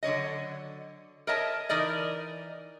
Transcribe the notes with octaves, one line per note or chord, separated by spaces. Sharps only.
D3 F#3 C#5 D#5
A#4 C#5 D#5 E5 A5
E3 D#4 A#4 D5 D#5